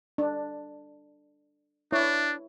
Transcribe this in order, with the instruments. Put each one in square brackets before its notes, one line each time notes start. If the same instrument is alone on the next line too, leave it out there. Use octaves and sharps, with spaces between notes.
[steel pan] D4
[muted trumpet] D4 [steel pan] E4 C#5